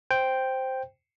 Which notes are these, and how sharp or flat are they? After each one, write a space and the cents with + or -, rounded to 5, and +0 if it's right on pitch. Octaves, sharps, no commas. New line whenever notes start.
C5 +0 G5 +0